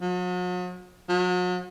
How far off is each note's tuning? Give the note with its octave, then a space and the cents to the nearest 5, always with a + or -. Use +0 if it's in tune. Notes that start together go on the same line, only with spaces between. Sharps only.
F#3 -45
F#3 -40